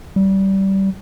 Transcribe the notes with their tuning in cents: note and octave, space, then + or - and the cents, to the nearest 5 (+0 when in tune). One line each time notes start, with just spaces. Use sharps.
G3 -20